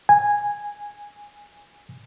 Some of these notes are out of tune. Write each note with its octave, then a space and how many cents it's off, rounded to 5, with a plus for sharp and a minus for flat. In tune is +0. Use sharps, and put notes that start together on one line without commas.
G#5 -10